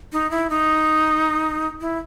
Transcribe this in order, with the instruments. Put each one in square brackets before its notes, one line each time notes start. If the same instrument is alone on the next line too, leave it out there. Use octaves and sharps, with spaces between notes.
[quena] D#4
E4
D#4
E4